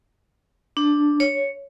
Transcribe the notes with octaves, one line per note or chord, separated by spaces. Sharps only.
D4
C#5